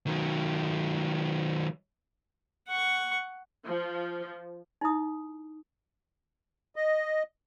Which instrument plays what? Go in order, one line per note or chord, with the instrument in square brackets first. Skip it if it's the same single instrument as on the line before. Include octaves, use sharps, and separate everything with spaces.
[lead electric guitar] D#3 F#3
[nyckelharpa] F#5 C#6
[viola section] F3
[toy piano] D#4 E4 D#6
[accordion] D#5